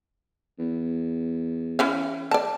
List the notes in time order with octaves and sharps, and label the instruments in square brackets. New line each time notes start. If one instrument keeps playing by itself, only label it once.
[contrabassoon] E2
[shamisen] E3 C#4 F5
D5 A5